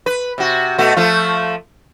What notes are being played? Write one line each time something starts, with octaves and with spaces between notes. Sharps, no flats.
B4
C3 F#4
B2 A3 F#4
F3 A3 F4